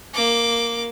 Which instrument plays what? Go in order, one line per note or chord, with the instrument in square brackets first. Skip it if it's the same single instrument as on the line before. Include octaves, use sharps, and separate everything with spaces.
[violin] A#3 D6